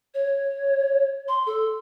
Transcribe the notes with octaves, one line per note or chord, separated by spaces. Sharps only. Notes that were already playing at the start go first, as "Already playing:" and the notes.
C#5
C6
A4